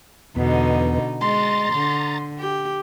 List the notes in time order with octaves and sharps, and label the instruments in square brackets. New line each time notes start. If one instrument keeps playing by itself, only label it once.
[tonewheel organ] E2 B3 [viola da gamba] B2 D3 D#4
[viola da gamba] G#3 [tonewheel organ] A#5 A6 [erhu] C6
[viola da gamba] D3
G4